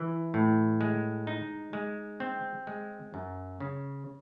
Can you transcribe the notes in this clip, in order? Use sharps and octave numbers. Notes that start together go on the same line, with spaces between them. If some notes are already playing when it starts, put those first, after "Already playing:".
Already playing: E3
A2
G#3
D#4
G#3
C4
G#3
F#2
C#3